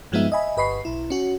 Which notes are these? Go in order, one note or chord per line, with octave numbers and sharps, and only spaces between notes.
G2 F3 G#3 B3 D#4 E5
D#5 E5 G#5 B5
G1 B4 D#5 B5 C#6 C7
B1 E4
C#4 F#4